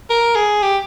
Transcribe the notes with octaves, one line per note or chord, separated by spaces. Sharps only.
A#4
G#4
G4